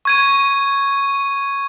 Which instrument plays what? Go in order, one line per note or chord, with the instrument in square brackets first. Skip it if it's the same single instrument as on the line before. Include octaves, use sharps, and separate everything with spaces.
[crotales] C#6 G#6 D#7